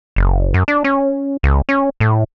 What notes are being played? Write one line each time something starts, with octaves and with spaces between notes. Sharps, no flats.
F#1
F#2
D4
C#4
C#2
C#4
A2